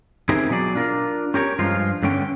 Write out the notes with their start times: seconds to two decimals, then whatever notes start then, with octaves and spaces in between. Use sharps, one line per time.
0.29 C4 D#4 E4 G4 G#4 A#4
0.50 B2 F#3 G#4 D5
0.75 D4 F4 A#4
1.34 C#4 G4 A#4 C#5
1.59 G2 F3 G#3 F4
2.03 G2 D3 C#4 G5